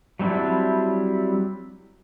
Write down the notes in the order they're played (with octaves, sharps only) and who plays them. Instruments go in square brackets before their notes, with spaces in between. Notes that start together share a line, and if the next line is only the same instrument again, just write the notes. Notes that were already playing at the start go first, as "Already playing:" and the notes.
[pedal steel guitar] F#3 G3 C4 D4 E4